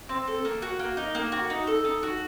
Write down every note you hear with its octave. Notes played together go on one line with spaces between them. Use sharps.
C4
A4
A#3
F#4
A#3
D#4
A#3
F#4
D#4
A4
D#4
F#4